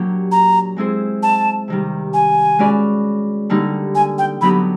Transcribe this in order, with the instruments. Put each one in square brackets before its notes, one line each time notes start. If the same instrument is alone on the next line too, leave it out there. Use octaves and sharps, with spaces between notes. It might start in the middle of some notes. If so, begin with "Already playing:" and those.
Already playing: [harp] A#2 F#3 A#3 D4 G4
[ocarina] A#5
[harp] G#3 C4 E4 G#4 C5
[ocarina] A5
[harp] C3 D#3 G3
[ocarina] G#5
[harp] G#3 C#4 F#4 B4 D5
D3 G3 A#3 D#4
[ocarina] G#5
G5
[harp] D3 F#3 B3 D#4 G4 [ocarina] B5